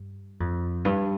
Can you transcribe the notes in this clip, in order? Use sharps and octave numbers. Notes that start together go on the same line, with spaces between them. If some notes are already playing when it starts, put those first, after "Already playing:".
Already playing: G2
F2
G2